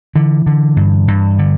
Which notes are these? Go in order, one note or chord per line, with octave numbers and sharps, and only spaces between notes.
D3 E3
D3
G2
G2
D3